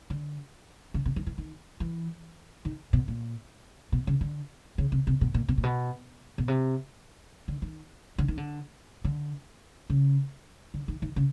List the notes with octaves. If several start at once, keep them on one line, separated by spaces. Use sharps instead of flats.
D3
C#3
C3
D#3
E3
D#3
E3
D#3
B2
A#2
B2
C#3
D3
C#3
C3
C3
B2
A#2
B2
A#2
B2
B2
C3
D3
D#3
D3
D#3
D3
D3
C#3
D3
D#3
D#3
C#3